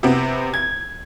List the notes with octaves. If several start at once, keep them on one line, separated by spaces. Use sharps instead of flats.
C3 B3 C4
G#6